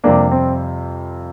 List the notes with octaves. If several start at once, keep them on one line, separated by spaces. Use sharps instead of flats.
F2 C3 G3 A#3 D4
C4